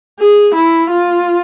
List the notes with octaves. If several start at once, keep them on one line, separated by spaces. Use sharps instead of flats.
G#4
E4
F4